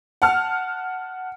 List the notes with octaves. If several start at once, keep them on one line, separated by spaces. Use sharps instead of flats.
F#5 A5 F6